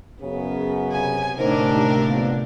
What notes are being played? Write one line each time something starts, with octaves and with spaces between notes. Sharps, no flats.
F#2 C#3 B3
C3 G#5
A2 D3 D4 D#4 A#4 C5
D#2
F2 A#3 B3